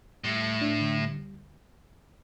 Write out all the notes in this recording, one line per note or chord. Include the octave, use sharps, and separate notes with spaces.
A2 G3
D2
D4
D3
G3
D2